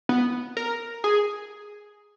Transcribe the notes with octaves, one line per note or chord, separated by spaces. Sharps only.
B3
A#4
G#4